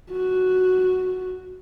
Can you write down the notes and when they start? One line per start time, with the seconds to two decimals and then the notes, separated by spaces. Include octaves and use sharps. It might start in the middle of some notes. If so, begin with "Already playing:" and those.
0.11 F#4